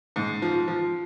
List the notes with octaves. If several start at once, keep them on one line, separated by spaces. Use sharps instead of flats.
G#2
F3
F3